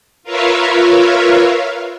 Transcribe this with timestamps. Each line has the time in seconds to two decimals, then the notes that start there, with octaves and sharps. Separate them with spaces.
0.23 F4 A#4 B4 C#5 E5 F5